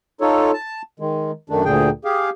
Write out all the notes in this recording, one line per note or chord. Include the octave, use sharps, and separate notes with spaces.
D#4 F4 A4 C#5
A5
D#3 G#3
F#2 D#3 A3 D4
D2 A#2 D3 G#4 G5
G4 G#4 F5